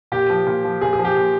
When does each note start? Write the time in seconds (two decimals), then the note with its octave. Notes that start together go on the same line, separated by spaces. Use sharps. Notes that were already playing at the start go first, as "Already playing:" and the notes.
0.12 A#2 G4
0.30 F3
0.47 A#2
0.64 F3
0.81 A#2 G#4
0.93 G#4
0.99 F3
1.04 G4
1.17 A#2